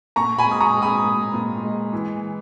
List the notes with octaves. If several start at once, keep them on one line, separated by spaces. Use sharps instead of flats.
A#2 A#5 C#6
G#5 B5
G#3 D#6
A#5 C#6
G#3
B5 D#6
A#2
A#2
G#3
E3